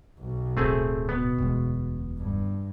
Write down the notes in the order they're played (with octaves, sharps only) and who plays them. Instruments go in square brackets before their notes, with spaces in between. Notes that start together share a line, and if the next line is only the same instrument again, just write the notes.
[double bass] B1
[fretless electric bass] D1 [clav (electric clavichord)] A3 C4 G#4
[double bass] B2 [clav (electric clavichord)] B3
[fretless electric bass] E1 D2 G#3
[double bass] G2